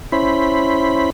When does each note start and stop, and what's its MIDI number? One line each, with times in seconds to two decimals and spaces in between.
0.12 1.10 61
0.12 1.10 64
0.12 1.10 72
0.12 1.10 83